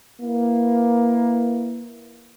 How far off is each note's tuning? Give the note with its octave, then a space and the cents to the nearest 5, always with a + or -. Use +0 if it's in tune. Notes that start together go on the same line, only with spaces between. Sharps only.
A#3 +15 E4 +10 B4 +5